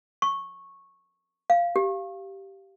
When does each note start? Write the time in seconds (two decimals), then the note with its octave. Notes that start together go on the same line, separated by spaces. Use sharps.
0.22 C#6
1.50 F5
1.76 G4